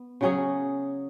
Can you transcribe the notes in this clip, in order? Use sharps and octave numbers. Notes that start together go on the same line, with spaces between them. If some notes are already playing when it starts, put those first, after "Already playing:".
Already playing: B3
C#3 F#3 C#4 G#4